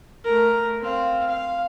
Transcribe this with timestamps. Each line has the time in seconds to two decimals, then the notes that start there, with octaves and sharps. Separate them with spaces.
0.24 A3 A#4
0.81 C4 F5
1.28 F5